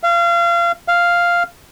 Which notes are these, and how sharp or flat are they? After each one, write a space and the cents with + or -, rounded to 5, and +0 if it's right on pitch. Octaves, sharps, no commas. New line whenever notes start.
F5 -30
F5 -5